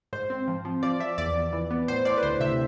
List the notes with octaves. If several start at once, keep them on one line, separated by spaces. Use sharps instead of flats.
G#2 C5
C4
F3
F3
F3 D5
F3 E5
E2 D5
E2
E3
B3
A2 C5
A2 D5
B4
D2 C5
C3 E5